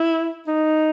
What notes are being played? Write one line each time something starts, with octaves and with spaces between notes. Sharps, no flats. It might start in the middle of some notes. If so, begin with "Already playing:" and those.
Already playing: E4
D#4